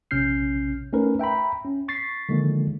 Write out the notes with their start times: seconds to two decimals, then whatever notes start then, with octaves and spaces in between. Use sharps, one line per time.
0.11 A#1 C3 C#4 F6 G6 C7
0.93 A3 C#4 D#4 A#4 B4
1.19 E5 G5 A#5 B5
1.65 C#4
1.88 C#6 A6 B6 C7
2.29 D3 D#3 F3 G#3 A#3